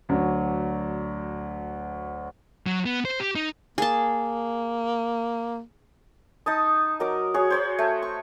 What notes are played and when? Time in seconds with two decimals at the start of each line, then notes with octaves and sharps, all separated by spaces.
0.09 D2 F#3 D4
2.66 F#3
2.86 B3
3.05 C5
3.20 G4
3.35 D#4
3.78 A#3 G#4 A5
6.46 D#4 A5 D#6
7.00 F#3 A#4 D#5 D6
7.34 F#4 G#4 C#5
7.50 C5 C#5 B5
7.78 A3
8.02 C#6